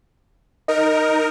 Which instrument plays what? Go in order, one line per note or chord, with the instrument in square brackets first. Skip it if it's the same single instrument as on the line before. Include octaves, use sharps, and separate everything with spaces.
[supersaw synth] D#4 A#4 [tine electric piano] D#5